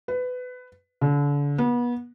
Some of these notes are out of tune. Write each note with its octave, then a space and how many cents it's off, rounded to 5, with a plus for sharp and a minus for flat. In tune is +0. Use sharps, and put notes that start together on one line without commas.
B4 +20
D3 -35
B3 -30